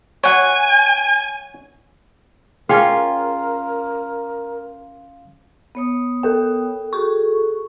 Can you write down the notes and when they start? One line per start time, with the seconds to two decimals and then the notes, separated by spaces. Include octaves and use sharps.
0.24 C#5 F#5 G#5
2.69 C#4 F4 G#4 A#4 F5 G5 C6
5.75 B3 C#5 D#6
6.23 A4 A#4 G5
6.93 F#4 G#4 A4 C#6